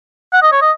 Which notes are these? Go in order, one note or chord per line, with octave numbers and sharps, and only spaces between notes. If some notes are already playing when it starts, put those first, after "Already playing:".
F#5
D#5
C#5
D#5